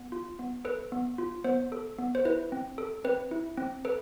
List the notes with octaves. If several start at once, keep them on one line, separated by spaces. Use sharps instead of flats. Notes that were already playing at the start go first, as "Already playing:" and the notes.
Already playing: B3
F4
B3
A4 B4
B3
F4
B3 C5
A4
B3
C5
E4 B4
C4
A4
C4 B4
E4
C4
A4 B4